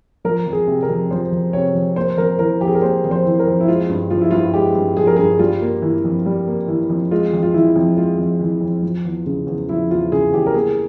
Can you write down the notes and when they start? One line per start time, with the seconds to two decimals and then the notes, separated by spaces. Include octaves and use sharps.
0.25 F3 A#4
0.47 F2
0.53 G#4
0.67 C3
0.83 A#4
0.89 F2
1.11 F3 C5
1.32 F2
1.53 C3 C#5
1.75 F2
1.96 A#3 C5
2.17 F2 A#4
2.39 E3 A#4
2.60 F2 G4
2.67 G#4
2.75 A#4
2.82 A#3 C5
3.04 F2
3.11 C5
3.25 E3
3.39 A#4
3.47 F2
3.61 E4
3.68 G#3 F4
3.89 G2
4.10 F3 F4
4.21 E4
4.31 G2 F4
4.54 G#3 G4
4.75 G2
4.97 F3 G#4
5.07 A#4
5.16 G2 G#4
5.39 G3 F4
5.62 A#3
5.82 E3
6.05 F2
6.26 G3
6.47 A#3
6.68 E3
6.90 F2
7.11 G#3 F4
7.33 F2
7.43 F4
7.54 E3 E4
7.76 F2
7.97 G#3 F4
8.18 F2
8.40 E3
8.61 F2
8.83 F3
9.05 E2
9.26 C#3
9.47 E2
9.69 F3 E4
9.91 E2 F4
10.12 C#3 G#4
10.33 E2 G4
10.46 A#4
10.54 A#3 G#4